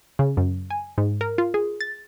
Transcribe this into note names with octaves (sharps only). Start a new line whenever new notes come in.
C#3
F#2
G#5
G#2
A#4
F4
G#4
A6